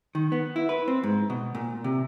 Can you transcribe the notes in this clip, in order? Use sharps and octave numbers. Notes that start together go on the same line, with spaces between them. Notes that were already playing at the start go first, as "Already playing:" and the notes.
D#3
B3
E4
B4
C4
G#2
B2
A#2
C3